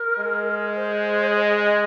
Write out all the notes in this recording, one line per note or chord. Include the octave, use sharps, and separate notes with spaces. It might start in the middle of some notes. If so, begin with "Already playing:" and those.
Already playing: A#4
G#3
C5
D#5
D#5